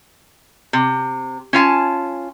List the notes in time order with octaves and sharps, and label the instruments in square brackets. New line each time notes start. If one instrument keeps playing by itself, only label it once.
[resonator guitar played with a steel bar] C3
C#4 F4 G#5 A5